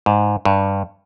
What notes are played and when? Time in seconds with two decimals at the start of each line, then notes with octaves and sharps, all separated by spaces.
0.06 G#2
0.45 G2